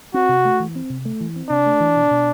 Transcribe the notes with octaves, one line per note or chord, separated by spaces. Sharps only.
C4 F#4
C3
A3
E3
C4
C3
A3
E3
C4
C3 D4
A3
E3
B2
B2